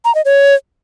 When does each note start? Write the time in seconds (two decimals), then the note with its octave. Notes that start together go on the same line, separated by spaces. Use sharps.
0.05 A#5
0.15 D#5
0.25 C#5